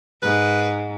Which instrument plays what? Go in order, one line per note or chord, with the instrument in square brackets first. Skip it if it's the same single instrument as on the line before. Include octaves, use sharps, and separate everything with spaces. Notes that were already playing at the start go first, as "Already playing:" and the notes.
[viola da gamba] G#2 [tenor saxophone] B4